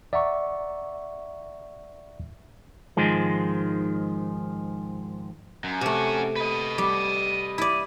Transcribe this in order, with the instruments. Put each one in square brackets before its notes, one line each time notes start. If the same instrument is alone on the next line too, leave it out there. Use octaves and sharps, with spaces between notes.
[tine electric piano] D5 E5 F#5 A#5 C#6
[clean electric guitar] G#2 D#3 F3 G#3
[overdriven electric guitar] F#2
[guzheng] C3 A3 [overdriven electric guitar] C#4 F#4
[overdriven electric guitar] B4 D#5
[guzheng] G3
E4 D5